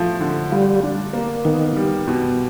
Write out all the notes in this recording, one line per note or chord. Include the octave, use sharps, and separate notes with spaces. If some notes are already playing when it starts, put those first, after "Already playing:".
Already playing: A2 F3 A3
D3
G3 F4
D4
A#3
D#3 B3
G3
B2